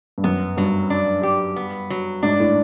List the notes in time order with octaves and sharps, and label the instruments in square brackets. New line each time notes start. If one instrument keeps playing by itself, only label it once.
[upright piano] G2
[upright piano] F#2 [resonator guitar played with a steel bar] B3
[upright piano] G2 [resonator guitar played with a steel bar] F#3
[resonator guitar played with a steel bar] D4
G4
B3
F#3
[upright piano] G#2 [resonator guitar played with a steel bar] D4
[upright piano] A2